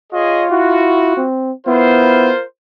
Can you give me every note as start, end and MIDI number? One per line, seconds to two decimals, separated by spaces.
0.13 1.25 65
0.13 0.45 68
0.13 0.45 73
0.13 0.45 75
0.51 1.14 64
0.51 1.25 66
1.17 1.52 60
1.67 2.32 59
1.67 2.31 64
1.67 2.44 65
1.67 2.44 70
1.67 2.44 72